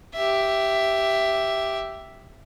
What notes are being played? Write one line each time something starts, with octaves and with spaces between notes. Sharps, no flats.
G4 E5